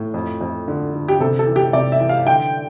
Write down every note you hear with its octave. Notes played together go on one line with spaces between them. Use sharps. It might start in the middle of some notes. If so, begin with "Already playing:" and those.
Already playing: A2
F2
F2
D3
D3
G4
C3 A4
A4
E3
G4
C3 D5
E5
E3
F5
D3 G5